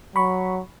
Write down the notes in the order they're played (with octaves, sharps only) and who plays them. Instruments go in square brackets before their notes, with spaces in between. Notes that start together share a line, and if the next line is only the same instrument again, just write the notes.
[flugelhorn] F#3 [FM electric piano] B5 C#6